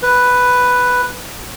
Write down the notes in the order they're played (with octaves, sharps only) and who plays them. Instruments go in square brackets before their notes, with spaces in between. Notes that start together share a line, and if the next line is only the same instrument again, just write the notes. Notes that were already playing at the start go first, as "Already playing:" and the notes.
[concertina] B4